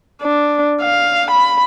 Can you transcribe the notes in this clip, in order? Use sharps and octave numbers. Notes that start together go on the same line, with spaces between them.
D4
F5
B5